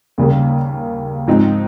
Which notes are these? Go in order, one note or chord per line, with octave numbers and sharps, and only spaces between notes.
D#2 C#3 G3 A#3
G#2 F3 C4 D#4